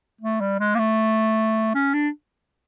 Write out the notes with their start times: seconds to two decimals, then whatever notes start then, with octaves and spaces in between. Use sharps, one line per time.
0.21 A3
0.41 G3
0.59 G#3
0.75 A#3
0.79 A3
1.75 C#4
1.94 D4